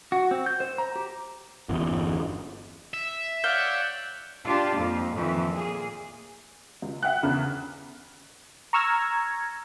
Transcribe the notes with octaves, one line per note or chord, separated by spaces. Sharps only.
F#4
C4
G6
C5
A#5
G4
G1 E2
E5
C#5 D5 F5 F#5 G6
D4 F4 G4
F2 A#3
F2 D#3 E3
A#2 A#3 G#4
C#2
E5 F#5 G5 F#6
E2 C#3
A#5 C#6 E6 F6 G#6 A#6